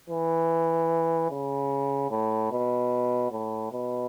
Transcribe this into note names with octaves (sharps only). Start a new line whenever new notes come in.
E3
C#3
A2
B2
A2
B2